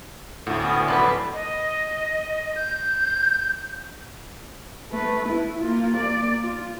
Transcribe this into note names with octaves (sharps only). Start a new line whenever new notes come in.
D2 A2 F#4
B3 C#4 D#6
F3 F#3 B3 B4 D5 C6
D#5
G6
A3 B4
E4
A#3 F4
A#3 D5
F4